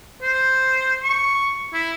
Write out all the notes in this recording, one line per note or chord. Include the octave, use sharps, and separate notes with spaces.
C5
C#6
E4